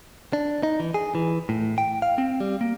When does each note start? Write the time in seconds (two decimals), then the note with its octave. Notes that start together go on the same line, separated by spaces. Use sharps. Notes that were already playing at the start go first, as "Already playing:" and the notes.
0.33 D4
0.63 D#4
0.80 E3
0.94 G#4
1.15 E3
1.49 A2
1.78 G5
2.02 F5
2.18 C4
2.40 G3
2.61 A#3